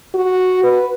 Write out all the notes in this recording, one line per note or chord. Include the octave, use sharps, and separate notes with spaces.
F#4
B4